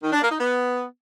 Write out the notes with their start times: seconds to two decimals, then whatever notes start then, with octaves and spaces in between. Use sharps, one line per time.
0.03 D#3
0.12 D4
0.22 A#3
0.31 D#4
0.40 B3